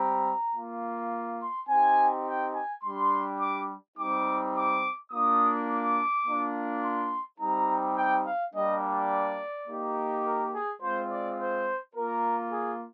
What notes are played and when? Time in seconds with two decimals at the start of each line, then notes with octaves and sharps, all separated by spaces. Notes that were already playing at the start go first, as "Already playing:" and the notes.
Already playing: G3 C4 G4 A#5
0.55 A#3 F4
1.41 C6
1.69 C4 D#4 G4 G#5
2.27 G5
2.54 G#5
2.83 G3 D4 G4 C6
3.40 D6
3.97 G3 C4 D#4 G4 D6
4.55 D6
5.11 A#3 D4 F4 D#6
5.68 D6
6.26 A#3 D4 F4
6.82 C6
7.39 G3 C4 D#4 G4 A#5
7.96 G5
8.25 F5
8.53 G3 A#3 D4 G4 D#5
8.81 D5
9.68 A#3 D#4 G4
10.25 A#4
10.53 G#4
10.81 G#3 C4 F4 C5
11.10 D5
11.39 C5
11.95 A#3 F4 A#4
12.52 G#4